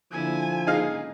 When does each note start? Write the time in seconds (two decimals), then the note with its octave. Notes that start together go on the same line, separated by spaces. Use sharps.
0.11 D3 F3 A#3 E4 G#5
0.67 G#2 C#3 A#3 D#4 G#4 F5